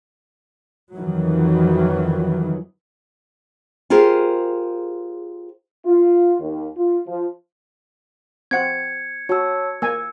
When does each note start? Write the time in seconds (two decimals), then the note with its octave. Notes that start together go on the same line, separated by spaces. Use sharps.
0.97 F2 D#3 E3 F#3
3.90 F4 G4 G#4 A#4 C5
5.85 F4
6.41 D#2
6.77 F4
7.08 F3
8.51 C4 F#5 G#6 C#7
9.29 F#4 C#5 A5 E6
9.82 A#3 G#5 E6